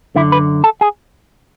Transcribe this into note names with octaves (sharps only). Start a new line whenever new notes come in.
F#2 D3 E4
B4
A4
G#4